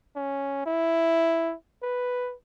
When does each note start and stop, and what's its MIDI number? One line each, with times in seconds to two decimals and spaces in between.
0.16 0.65 61
0.66 1.54 64
1.83 2.35 71